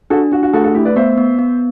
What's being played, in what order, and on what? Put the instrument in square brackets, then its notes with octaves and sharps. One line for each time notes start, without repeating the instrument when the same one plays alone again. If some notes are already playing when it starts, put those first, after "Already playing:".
[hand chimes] D4 [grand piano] F#4 A4
[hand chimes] D4 [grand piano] F#4
[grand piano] F#4
[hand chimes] A3 [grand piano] F#4 A4
[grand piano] F#4 A4
[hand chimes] A3 [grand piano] E4 G4
[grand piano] B4 D5
[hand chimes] B3 [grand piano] C5 E5
[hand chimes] B3
B3